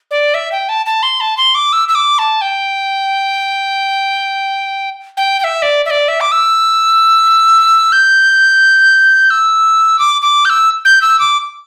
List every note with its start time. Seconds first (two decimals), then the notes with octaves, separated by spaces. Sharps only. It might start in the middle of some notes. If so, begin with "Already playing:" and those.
0.11 D5
0.34 E5
0.52 G5
0.69 A5
0.86 A5
1.03 C6
1.21 A5
1.37 C6
1.55 D6
1.73 E6
1.88 E6
1.95 D6
2.19 A5
2.41 G5
5.17 G5
5.40 G5
5.44 E5
5.62 D5
5.86 E5
5.90 D5
6.08 E5
6.21 D6
6.32 E6
7.92 G6
9.30 E6
9.99 D6
10.22 D6
10.45 G6
10.50 E6
10.85 G6
11.02 E6
11.19 D6